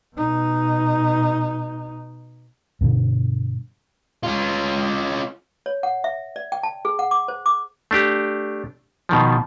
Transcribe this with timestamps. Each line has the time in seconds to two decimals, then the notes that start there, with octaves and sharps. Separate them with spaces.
0.16 B2 D#4
2.81 G2 B2 D3
4.23 C#4 F4
5.66 C#5
5.83 F#5
6.04 E5
6.36 D5
6.52 G5
6.63 A5
6.85 G#4
6.99 F#5
7.11 D6
7.28 C5
7.46 D6
7.91 A3 D4 G4
9.09 B2 D#3 F3